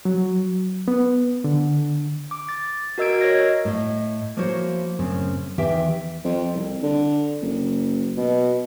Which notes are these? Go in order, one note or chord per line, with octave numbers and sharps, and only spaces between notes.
F#3
B3
D3
D6
A6
F#4 A#4 D#5 E6 G#6 D7
A#4 C#5 D#5 G#6 A#6
A2 D#5
F3 A#3 E4 F#4 C5 C#5
F#2 A2 C#3 C4 C#4
E2 D#3 E3 G4 E5 G5
F2
C2
D3
F#1
B2